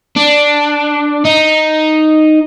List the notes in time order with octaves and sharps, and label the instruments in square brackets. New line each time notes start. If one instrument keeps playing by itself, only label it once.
[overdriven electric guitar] D4
D#4